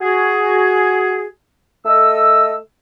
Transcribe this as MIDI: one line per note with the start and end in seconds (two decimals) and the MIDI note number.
0.01 1.26 66
0.01 1.26 68
1.86 2.55 57
1.86 2.55 69
1.86 2.55 75
1.86 2.55 88